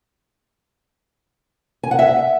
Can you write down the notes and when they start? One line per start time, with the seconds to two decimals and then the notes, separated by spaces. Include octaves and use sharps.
1.83 G#5
1.91 F#5
1.99 E5